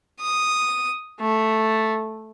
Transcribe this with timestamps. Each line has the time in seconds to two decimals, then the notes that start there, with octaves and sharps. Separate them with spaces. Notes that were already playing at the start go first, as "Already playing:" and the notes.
0.20 D#6
1.20 A3